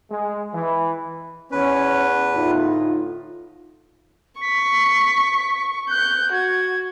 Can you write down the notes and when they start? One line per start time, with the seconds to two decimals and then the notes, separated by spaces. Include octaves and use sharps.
0.10 G#3
0.53 E3
1.52 E2 C#4 B4
2.35 A2 D3 D#4 F4
4.41 C#6 B6
5.90 F#6 G6
6.32 F#4 G#6